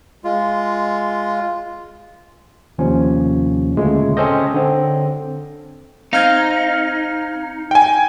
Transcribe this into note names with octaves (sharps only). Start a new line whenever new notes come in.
G#3 F4
D#2 C3 F3 C#4
D2 A#2 C#3 G#3 A3
C4 C#4 A4 C5 D#5
D3 C4
C4 D#4 F5 F6 G#6
G5 G#5